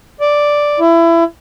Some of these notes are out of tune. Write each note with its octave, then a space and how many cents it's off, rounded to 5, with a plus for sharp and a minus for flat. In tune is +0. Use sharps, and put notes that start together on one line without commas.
D5 +0
E4 +25